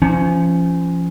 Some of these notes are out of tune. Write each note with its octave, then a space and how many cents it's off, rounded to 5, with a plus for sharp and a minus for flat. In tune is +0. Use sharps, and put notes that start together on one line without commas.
F3 -30 C#4 +0